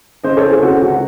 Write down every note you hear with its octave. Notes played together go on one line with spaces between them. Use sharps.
C#3 C5 D#5
A4 C#5
E2
G#4 C5
C#3 F#4 A4
C#2 F#4